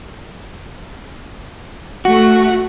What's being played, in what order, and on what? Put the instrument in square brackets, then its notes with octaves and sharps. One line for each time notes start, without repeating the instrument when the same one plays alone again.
[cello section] A3 [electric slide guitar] F#4